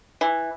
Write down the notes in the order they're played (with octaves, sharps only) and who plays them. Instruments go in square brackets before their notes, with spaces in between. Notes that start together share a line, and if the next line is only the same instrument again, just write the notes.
[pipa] E3